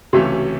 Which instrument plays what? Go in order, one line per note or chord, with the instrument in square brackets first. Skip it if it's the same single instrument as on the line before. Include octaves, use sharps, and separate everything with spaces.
[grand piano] C#2 C3 E3 A3 C#4 [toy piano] F#4